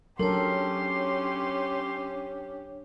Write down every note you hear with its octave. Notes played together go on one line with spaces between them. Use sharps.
F#3 C#4 D4 G4 A4 A#4 C#5 C6